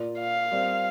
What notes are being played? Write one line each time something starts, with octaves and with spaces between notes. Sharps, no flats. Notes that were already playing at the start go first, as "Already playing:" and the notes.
Already playing: A#2 A#3 F4 D5
F5
G3 C4 G4 A#4 D5